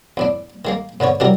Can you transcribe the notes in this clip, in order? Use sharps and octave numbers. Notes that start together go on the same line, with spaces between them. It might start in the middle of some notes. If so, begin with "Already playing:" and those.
E2 A2 D4
D#3 G#3 A#3
G#2 D3 B3 C#5
C3 E3 F#3 G3 A#4